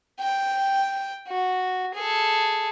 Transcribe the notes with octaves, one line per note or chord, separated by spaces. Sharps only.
G5
F#4
G#4 A4